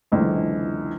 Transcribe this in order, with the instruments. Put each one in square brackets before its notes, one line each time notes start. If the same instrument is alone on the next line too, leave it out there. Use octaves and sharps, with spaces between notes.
[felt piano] F#1 C#2 D3 E3